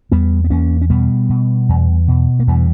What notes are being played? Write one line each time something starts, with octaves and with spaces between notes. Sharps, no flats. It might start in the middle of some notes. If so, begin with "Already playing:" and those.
E2 G3 B3
B3
E2 A#3 C#4
C#4
B2 G3 B3
B2
E2
B2
A#3
E2 E3 G3